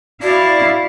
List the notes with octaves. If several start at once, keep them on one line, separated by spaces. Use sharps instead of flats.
E4 F#4 D5 F5